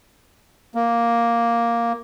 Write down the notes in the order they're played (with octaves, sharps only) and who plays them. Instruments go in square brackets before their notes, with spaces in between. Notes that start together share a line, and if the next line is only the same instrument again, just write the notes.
[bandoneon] A#3